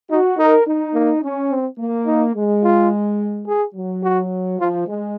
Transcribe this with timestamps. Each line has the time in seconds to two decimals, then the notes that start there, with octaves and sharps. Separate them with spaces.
0.10 D#4 F#4
0.38 D#4 A#4
0.66 D#4
0.94 A#3
1.22 C#4
1.50 C4
1.79 A#3
2.06 D#4
2.35 G#3
2.64 F4
3.47 G#4
3.75 F#3
4.03 F#4
4.59 F3 F4
4.87 G#3